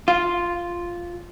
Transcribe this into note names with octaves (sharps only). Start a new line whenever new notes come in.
F4